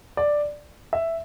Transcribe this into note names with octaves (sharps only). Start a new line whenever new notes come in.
D5
E5